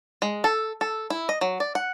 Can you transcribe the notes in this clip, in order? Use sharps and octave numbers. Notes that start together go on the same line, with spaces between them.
G#3
A4
A4
E4
D#5
F#3
D5
F#5